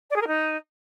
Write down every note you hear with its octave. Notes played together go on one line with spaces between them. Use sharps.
D5
G#4
A#4
D#4